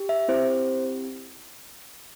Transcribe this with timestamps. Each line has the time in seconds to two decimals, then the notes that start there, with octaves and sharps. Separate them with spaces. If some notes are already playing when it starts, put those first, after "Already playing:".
Already playing: G4
0.09 E5
0.28 C4 E4 G4 C5